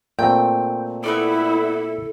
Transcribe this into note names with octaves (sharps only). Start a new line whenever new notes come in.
A#2 A3 C4 G5
B3 C#4 E4 A4 D5